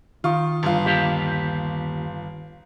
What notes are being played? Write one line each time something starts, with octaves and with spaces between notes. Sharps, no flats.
D#3 F4
G1 F4
D#2 G4 F5